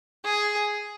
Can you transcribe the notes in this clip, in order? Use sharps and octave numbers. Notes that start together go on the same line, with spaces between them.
G#4